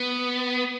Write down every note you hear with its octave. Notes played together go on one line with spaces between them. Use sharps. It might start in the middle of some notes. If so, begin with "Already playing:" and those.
Already playing: B3